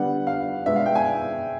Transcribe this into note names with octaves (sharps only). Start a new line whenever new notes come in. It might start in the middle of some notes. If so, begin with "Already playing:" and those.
Already playing: D3 G3 B3 D4 F#5
F5
B2 G#3 B3 D4 E5
F5
G5
G#5